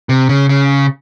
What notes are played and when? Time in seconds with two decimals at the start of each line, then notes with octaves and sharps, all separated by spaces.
0.09 C3
0.29 C#3
0.49 C#3